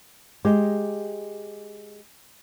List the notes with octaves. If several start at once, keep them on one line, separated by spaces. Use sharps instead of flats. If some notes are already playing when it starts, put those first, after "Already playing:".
G#3 G4